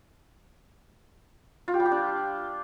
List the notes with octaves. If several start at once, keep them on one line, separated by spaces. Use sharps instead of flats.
F4
G4
G3
G4
D4